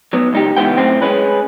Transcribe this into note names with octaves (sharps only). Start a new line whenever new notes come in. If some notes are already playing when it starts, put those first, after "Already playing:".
F#3 B3
C#2 D#4 G4
C#2 C#3 E3 B3 G5
F#2 A2 C4
G#3 C#4 B4